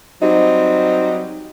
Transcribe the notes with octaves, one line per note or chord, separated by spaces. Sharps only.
F#3 G3 C4 D#4 G4